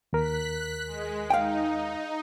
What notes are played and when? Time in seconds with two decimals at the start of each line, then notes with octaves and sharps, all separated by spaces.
0.13 D#2 A#4 F#6 B6
0.86 G#3
1.30 D#4 F5 G5